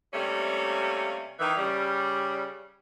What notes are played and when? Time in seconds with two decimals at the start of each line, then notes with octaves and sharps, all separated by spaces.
0.12 C3 G3 A3 A#3 C#4
1.39 D#3 E3
1.57 C#3 G3